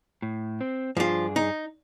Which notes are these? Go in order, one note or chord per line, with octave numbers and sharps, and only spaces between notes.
A2
C4
G2 F3 D4 F4 G#4
D#4